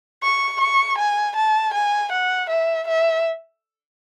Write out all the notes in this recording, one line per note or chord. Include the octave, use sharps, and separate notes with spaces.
C#6
C#6
G#5
A5
G#5
F#5
E5
E5